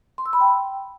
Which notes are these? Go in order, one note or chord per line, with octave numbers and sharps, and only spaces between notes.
C6
E6
B5
G5